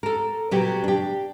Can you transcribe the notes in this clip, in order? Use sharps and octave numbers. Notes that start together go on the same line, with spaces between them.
A4 A#4
A#2 C#3 F#3 B3 G4
D4 G4